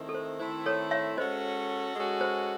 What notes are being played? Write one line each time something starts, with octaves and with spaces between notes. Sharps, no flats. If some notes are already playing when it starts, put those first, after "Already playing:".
Already playing: D#3 A3 C4 E4
A4
C5
D#3 A3 C4 E4 C5
A4 C#5
C#5 E5
G#3 C#4 F#4 A4 C5 D#5
G#3 C#4 F#4 A4
C5